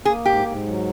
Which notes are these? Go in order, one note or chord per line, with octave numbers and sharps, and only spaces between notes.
A#3 G#4
G#2 G4
G#2
F#3